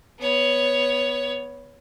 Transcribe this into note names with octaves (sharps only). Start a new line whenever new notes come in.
B3 C#5